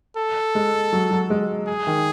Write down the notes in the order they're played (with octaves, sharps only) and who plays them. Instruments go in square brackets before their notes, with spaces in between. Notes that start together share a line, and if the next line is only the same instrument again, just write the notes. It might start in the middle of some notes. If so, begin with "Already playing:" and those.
[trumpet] A4
[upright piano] G#3
F#3
F#3
G#3
[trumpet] G#4
[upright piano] D#3